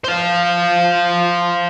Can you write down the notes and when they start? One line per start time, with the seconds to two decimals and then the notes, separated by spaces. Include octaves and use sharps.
0.04 C5 F5